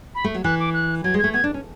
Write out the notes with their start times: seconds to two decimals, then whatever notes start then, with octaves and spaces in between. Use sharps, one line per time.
0.15 B5
0.24 A3
0.34 F#3
0.44 E3 F#6
0.59 D6
0.74 F#6
1.04 F#3 G#6
1.14 G#3
1.19 A3 G#6
1.34 B3 G#6
1.44 D4
1.54 C#4